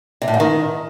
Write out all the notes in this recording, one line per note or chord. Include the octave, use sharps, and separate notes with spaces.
C3
A2
G#2
D#3